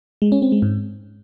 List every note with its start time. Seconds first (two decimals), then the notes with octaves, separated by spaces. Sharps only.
0.22 G#3
0.32 C#4
0.42 C4
0.52 G#3
0.62 G#2